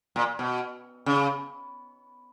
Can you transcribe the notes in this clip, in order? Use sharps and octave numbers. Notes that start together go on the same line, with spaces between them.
A#2
B2
C#3